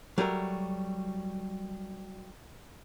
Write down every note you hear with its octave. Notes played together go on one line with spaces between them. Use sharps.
F#3 G3 A3 A#4